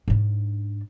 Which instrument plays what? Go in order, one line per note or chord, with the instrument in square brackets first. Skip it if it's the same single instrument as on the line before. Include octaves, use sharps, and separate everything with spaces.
[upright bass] G#2 D4